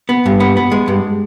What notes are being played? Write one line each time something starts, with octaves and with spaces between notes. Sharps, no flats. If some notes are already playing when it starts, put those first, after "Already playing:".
B3
G2
B3
B3
G#3
G2